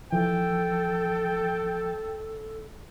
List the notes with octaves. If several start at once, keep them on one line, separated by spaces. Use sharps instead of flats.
E3 F3 A4 G5